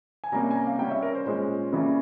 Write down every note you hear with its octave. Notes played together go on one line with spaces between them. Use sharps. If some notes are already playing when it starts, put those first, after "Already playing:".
G#5
C3 G3 A#3 C#4 A#5
G#5
A#5
F5
C#3 G3 C#4 G5
E5
A#4
C5
A#2 G#3 C#4 C5
C#3 E3 G3 A#3